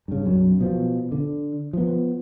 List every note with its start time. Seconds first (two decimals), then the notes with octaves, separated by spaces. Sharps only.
0.08 G2 C#3
0.25 B1 F#2 F#3
0.61 B2 F3
1.12 D3
1.73 F3 B3